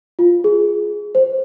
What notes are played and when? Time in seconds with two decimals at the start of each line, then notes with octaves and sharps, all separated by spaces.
0.19 F4
0.44 G#4
1.15 C5